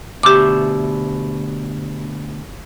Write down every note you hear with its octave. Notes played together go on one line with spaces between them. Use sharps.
D2 B2 G4 E5 D6